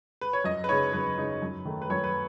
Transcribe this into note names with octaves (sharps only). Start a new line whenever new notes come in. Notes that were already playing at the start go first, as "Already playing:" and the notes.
B4
C#5
F#2 D#5
B4
C#3 G#3 D#4 C#5
F#2 B4
C#3 G#3 D#4
F#2
D#3 A3
B4
F#2 C#5
B4